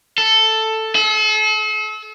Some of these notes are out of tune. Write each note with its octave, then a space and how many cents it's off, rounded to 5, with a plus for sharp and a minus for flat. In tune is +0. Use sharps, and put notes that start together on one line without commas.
A4 +5
A4 -40